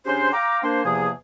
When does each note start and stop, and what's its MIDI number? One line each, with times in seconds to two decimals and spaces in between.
0.06 0.29 49
0.06 0.29 61
0.06 0.29 62
0.06 0.29 67
0.06 0.29 72
0.32 0.61 77
0.32 0.61 79
0.32 0.61 82
0.32 0.61 86
0.63 0.84 58
0.63 0.84 62
0.63 0.84 72
0.85 1.09 40
0.85 1.09 48
0.85 1.09 53
0.85 1.09 58
0.85 1.09 68